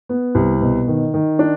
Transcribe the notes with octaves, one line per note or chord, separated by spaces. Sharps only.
B3
C2
B2
D#3
D#3
D4